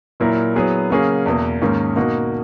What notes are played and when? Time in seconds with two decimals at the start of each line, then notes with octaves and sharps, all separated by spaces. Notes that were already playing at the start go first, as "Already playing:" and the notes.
0.20 A#2 F#3 A#3 E4 A#4
0.56 F#3 B3 E4 G#4
0.90 C#3 F#3 A#3 C#4 G#4
1.26 E2 B2 A#3
1.62 G#2 D#3 A#3 C#4
1.96 B2 A#3 D#4 F#4